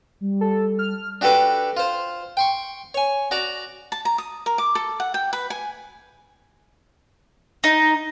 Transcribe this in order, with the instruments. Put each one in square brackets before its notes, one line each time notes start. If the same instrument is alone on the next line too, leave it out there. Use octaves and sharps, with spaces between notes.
[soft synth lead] G3
[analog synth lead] A4
F6
[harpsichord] D4 F#4 G4 A4 B4 D6
F4 C5
G5 C6 C#6
C#5 G#5
F#4 D5 A#5
[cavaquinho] A5
A#5
D#6
A#4
D6
A4
F#5
G5
B4
G#5
[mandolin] D#4